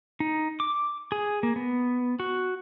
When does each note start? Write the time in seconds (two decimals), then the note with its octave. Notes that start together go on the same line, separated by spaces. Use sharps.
0.20 D#4
0.60 D6
1.12 G#4
1.43 A#3
1.56 B3
2.20 F#4